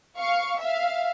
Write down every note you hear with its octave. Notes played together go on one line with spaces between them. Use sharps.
F5 C#6
E5 F5